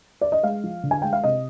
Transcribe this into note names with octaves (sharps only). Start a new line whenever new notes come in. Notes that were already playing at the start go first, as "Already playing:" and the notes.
D5
D#5
G#3 F5
F3
D3
G#5
G#3 G5
F5
C3 D#5